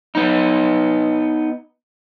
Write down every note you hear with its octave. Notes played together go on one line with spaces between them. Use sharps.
B3 D#4